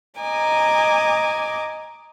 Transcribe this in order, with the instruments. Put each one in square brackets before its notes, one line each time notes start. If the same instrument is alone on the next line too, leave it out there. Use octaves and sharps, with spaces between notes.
[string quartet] D#5 G#5 A#5 D6